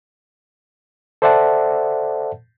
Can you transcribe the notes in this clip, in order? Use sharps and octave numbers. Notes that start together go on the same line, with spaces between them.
A4 C5 D5 E5 F#5 A5